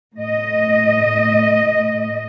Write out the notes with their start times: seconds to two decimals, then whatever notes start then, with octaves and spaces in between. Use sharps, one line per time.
0.15 A2 D#5